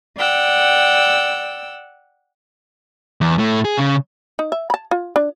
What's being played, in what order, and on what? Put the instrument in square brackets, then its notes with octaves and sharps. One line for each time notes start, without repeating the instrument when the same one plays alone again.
[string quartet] D5 F#5 G5 E6
[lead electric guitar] E2
A2 A3
G#4
C#3
[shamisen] D#4
E5
A5 B5
F4
D4